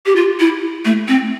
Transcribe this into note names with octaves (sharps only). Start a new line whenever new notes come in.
G4
F4
E4
A3
C4